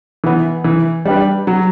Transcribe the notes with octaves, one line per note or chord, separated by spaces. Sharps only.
E3 B3
E3
G3 D4 G4 B4
F#3